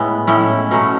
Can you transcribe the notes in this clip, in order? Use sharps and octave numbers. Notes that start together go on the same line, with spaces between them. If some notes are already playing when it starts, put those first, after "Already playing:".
Already playing: A2 G#3 B3
A2 G#3 C#4 E4
B2 F#3 A3 C#4